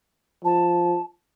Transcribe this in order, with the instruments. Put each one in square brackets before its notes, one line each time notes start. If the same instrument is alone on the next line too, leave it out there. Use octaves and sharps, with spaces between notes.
[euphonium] F3 [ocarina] A5